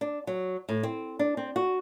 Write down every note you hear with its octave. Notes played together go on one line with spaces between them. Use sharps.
D4
F#3
A2
C4
D4
C4
F#4